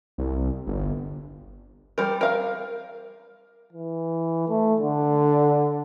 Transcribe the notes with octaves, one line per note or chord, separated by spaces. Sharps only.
C2
G1
G3 A#4
A#4 F5
E3
A3
D3